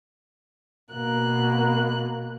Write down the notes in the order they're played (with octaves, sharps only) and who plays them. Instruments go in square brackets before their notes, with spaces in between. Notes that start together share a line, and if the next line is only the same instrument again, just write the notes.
[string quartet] B2 A#3 F#6